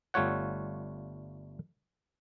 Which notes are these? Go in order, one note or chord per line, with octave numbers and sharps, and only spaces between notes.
G1 G3 A3 F4 C#5 F#5